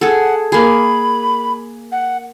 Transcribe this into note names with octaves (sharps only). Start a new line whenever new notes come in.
G#4 A4 F#5
A#3 G#4 B5
F#5